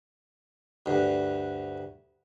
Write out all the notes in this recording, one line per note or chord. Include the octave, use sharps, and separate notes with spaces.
D2 G2